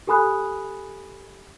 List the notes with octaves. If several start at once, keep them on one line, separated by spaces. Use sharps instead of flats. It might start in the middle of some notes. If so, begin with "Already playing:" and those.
G4 A4 G#5 B5 D#6 F#6